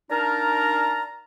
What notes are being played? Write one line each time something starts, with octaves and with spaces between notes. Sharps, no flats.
D4 D#4 A#4 F5 A5 A#5